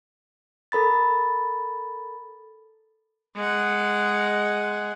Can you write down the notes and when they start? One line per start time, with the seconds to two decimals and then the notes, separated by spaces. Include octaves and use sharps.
0.72 A4 A#4 B5 A6
3.36 G#3 F#5